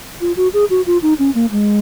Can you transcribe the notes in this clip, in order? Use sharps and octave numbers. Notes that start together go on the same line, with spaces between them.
F4
F#4
G#4
F#4
F4
D#4
C#4
A#3
G#3